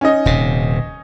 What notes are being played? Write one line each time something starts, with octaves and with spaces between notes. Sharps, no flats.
C#4 D#4 D#5
D#1 C3